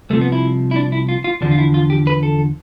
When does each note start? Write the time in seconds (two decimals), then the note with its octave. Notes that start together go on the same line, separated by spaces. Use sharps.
0.10 C2 C3 F3 A3
0.21 B3
0.32 E4
0.71 E4
0.76 D4
0.92 E4
1.09 F4
1.24 F4
1.41 E2 D3 F3 D4
1.51 F4
1.58 E4
1.74 F4
1.90 G4
2.07 B4
2.23 A4